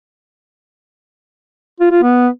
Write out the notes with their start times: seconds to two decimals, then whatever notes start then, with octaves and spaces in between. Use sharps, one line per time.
1.80 F4
1.91 F4
2.03 B3